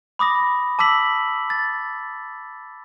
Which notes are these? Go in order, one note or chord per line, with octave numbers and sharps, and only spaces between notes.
B5 D6 D#6 A#6
A5 D6 E6 B6 F#7
A6